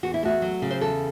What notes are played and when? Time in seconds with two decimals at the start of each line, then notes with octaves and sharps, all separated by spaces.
0.03 E2 F#4
0.14 E4
0.23 A3 F#4
0.42 F#3
0.62 C#3
0.71 C5
0.81 E2 A4